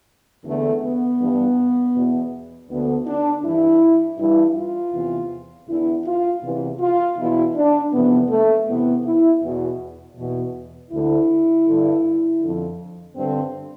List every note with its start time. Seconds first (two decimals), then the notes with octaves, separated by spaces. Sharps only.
0.44 E2 D3 A3
0.82 B3
1.19 G2 E3
1.94 E2 B2
2.69 D2 D3 B3
3.06 D4
3.43 G2 E3 E4
4.18 G2 E3 E4
4.56 F4
4.93 E2 C3 E3
5.68 E2 D3 E4
6.05 F4
6.43 E2 C3 E3
6.80 F4
7.17 E2 B2 E4
7.55 D4
7.92 F2 C3 E3 B3
8.29 A3
8.67 E2 C3 E3 B3
9.04 E4
9.42 E2 B2
10.17 E2 B2
10.91 D2 D3 E4
11.66 G2 D3
12.41 F2 D3
13.15 G2 D3 C4